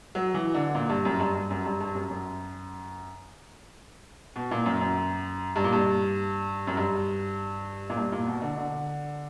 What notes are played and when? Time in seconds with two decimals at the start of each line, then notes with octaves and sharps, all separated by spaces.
0.15 F#3
0.34 E3
0.54 D3
0.75 A#2
0.89 G2
1.05 F#2
1.20 G2
1.34 G2
1.50 F#2
1.65 G2
1.80 G2
1.95 F#2
2.10 F#2
4.36 B2
4.51 A#2
4.66 F#2
4.81 F#2
5.56 G2
5.64 A#2
5.73 G2
6.67 F#2
6.77 G2
7.90 A#2
7.97 G2
8.12 A#2
8.27 B2
8.42 D3
8.58 D3